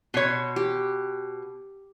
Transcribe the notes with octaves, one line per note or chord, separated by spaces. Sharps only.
B2 C#5 C6
G4